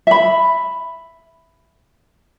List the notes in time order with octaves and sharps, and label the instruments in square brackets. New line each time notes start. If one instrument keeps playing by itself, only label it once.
[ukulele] E5 B5